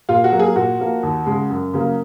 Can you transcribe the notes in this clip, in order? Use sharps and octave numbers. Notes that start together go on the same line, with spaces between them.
A#2 F4
F#4
F#3 A#3
G#4
A#2 F#4
F3 A#3
D#2
C#3 G#3
F#2
C#3 F#3 A#3